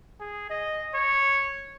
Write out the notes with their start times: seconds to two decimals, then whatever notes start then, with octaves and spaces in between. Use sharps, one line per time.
0.20 G#4
0.50 D#5
0.95 C#5